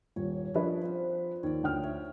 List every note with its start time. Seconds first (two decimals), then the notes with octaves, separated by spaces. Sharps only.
0.16 D#1 C#5
0.54 F3 C#4 D4 G#4 B4
0.81 C4 F4 C5
1.43 D#2 C#5 D5
1.63 D2 G5 F6
1.83 C#5 E5